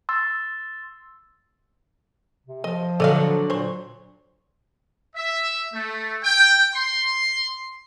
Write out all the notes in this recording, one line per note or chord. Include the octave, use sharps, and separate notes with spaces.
C6 E6 A6
C3
F3 D#5
D3 F#3 A4 D#5 F5
A#2 C5 C#5
E5
A3
G5
C6